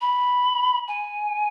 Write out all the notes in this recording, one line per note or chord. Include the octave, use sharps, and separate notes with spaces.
B5
G#5